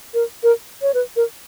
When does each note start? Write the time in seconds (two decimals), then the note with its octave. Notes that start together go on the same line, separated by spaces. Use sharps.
0.14 A#4
0.43 A#4
0.82 C#5
0.94 B4
1.16 A#4